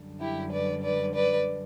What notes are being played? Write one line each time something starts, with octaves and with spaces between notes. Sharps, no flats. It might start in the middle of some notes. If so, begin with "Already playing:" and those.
Already playing: F#2 D3 G3
E4 G4
B4 D5
B4 D5
B4 D5